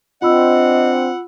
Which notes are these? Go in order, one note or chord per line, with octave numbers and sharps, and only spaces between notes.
C4 D4 F4 D#5 F#5 B5 E6